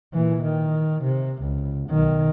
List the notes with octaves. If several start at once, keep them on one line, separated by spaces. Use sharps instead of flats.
A#2 E3
D#3
C3
C#2
B1 D#3